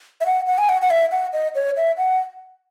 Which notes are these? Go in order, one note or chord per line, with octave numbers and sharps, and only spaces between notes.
E5
F#5
F#5
G#5
F#5
F#5
E5
F#5
D#5
C#5
E5
F#5